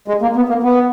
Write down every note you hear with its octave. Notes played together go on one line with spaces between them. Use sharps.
G#3
A#3
B3
A#3
B3